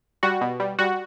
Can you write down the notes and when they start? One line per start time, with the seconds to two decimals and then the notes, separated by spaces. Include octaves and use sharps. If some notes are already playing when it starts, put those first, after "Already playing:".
0.23 G3 F#4
0.41 B2
0.60 G3
0.79 G3 F#4